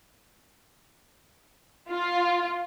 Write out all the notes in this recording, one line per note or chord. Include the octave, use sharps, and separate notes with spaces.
F4